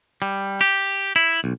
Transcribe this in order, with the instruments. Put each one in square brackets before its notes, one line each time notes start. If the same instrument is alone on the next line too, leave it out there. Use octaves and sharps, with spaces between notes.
[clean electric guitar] G3
G4
E4
B1